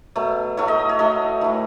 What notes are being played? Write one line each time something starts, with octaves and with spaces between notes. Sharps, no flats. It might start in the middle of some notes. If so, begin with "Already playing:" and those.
B2 F#3 A3
A2 F#3 A3 C#5
D#5
C#5
A2 F#3 A3 D#5
A2 E3 A3